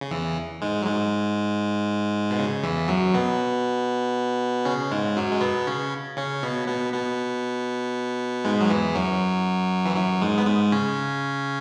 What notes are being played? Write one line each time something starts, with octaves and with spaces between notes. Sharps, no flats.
C#3
E2 E3
G#2 G#3
F#3
G#2 G#3
B2
C#3
E2 E3
F#2 F#3
B2 B3
C#3 C#4
G#2 G#3
F#2 F#3
G#3
B2 B3
C#3 C#4
C#3 C#4
B2 B3
B2 B3
B2 B3
G#2 G#3
F#3
E2 E3
F#2 F#3
E3
F#2 F#3
G#2 G#3
B3
G#2 G#3
C#3 C#4